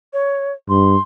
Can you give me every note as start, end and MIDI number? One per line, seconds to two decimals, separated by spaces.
0.13 0.52 73
0.69 0.96 43
0.69 1.01 84